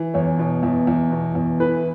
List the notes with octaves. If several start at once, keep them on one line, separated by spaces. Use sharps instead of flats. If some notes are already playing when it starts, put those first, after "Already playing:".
Already playing: E3
E2 C#5
B2
E2
E2
B2
E2
E3 B4